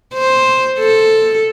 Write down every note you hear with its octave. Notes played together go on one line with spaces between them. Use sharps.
C5
A4